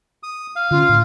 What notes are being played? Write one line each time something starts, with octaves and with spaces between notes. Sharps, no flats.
D#6
F5
D3 C#4 F4
A2